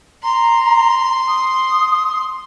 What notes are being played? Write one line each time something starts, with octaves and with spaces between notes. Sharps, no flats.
A#5 C6
D#6